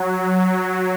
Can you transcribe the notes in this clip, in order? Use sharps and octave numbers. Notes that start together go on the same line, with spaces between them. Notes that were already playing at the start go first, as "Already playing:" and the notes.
Already playing: F#3
F#3